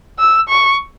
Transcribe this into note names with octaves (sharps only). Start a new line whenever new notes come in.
E6
C#6